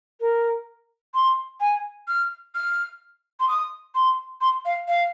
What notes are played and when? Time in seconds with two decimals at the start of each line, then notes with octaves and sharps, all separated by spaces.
0.20 A#4
1.14 C6
1.60 G#5
2.08 F6
2.54 F6
3.40 C6
3.48 D#6
3.95 C6
4.41 C6
4.65 F5
4.88 F5